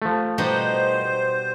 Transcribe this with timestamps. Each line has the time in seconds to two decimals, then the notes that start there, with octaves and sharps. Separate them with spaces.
0.02 F3 A3
0.38 B2 G3 D#4 C5